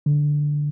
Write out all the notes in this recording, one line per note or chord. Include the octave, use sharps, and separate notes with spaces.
D3